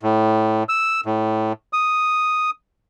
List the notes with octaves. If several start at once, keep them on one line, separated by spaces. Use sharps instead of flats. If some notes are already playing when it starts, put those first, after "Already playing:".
A2
E6
A2
D#6